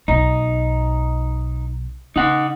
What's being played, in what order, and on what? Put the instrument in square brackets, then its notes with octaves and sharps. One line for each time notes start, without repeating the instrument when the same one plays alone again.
[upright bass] B1 [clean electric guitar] D#4
[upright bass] C#3 [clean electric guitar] D#4 F#5